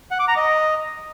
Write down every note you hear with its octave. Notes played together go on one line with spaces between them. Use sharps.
F#5
D6
A#5
D#5